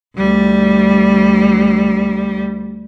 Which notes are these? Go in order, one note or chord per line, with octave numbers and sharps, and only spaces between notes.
D2 G3